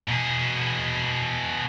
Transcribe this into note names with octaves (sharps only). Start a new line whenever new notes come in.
B2 G#4